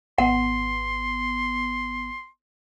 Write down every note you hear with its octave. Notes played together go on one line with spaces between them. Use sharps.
G#1 B3 F#5 C6